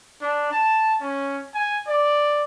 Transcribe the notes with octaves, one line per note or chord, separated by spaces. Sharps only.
D4
A5
C#4
G#5
D5